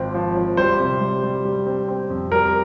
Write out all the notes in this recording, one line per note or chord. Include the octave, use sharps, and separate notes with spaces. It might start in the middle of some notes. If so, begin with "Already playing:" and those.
Already playing: G#1 F3 C4
F3
F3
G3 C5
C3
G3
G3
G3
C4
C4
F2
G3 A#4